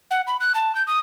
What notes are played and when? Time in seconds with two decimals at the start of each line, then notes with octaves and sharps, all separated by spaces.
0.11 F#5
0.27 B5
0.40 F#6
0.55 A5
0.75 G6
0.87 D#6